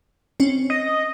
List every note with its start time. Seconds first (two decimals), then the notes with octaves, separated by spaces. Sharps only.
0.40 C4 C#4
0.70 D#5